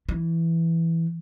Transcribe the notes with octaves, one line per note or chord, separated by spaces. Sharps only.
E3